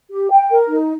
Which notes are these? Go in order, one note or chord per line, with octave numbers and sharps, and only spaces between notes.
G4
G5
A#4
D#4